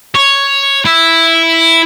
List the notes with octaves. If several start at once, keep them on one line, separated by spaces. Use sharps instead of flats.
C#5
E4